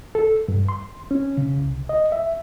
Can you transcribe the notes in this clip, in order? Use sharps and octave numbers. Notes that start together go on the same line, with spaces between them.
A4
G2
C6
C#4
C#3
C2
D#5
E5